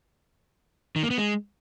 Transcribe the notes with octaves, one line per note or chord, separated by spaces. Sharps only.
D#3
A#3
B3
G#3